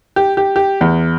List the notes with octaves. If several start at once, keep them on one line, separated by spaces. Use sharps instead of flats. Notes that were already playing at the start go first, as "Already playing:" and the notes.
G4
G4
G4
E2